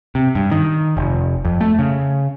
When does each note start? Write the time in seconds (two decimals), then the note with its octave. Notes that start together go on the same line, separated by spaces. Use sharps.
0.15 C3
0.35 G2
0.52 D#3
0.97 F1
1.45 F2
1.61 A3
1.79 C#3